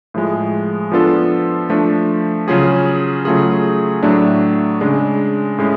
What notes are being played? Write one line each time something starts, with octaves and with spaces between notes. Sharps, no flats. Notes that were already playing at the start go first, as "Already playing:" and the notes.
A2 F3 G#3
F3 B3 D4 F4 A4
F3 A3 D4
C#3 F#3 C#4 F4 G#4
C#3 F#3 A3 F4 G#4
A2 F#3 A3 D4
C#3 G#3 D4
A2 G#3 C#4